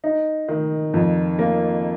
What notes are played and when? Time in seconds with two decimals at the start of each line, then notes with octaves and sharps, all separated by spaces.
0.04 D#4
0.48 D#3
0.94 F2
1.39 A#3